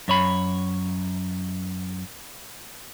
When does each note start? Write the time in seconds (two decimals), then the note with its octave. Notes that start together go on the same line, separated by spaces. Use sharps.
0.08 F#2 C#5 B5